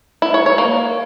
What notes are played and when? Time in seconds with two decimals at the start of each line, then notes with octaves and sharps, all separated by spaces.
0.22 E4
0.34 C#5
0.46 C#5
0.58 A#3